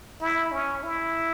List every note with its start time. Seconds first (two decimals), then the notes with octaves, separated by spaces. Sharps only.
0.21 E4
0.52 C#4
0.83 E4